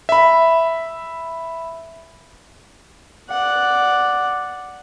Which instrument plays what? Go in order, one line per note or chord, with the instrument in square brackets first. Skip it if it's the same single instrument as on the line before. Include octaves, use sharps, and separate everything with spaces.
[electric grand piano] E5 B5
[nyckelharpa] D5 F#5